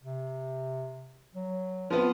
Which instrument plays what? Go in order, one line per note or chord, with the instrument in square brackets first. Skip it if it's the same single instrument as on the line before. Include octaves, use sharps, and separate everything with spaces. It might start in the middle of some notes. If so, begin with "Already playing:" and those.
[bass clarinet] C3
F#3
[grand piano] F3 B3 [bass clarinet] C4